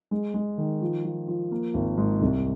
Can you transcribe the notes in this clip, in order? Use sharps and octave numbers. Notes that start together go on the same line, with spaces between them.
G#3
G#3
D#3
F3
F3
F3
A#3
G#1
G#2
C2